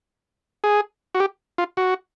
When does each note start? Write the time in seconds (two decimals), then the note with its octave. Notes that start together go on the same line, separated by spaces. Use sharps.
0.64 G#4
1.15 F#4
1.20 G4
1.58 F4
1.77 F#4